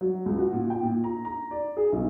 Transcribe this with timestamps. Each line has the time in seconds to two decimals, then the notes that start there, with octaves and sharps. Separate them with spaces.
0.01 F#3
0.26 C#2
0.38 F#4
0.53 A#2
0.70 G5
0.83 A#2
1.04 A#5
1.25 A#5
1.51 D5
1.77 G#4
1.92 B1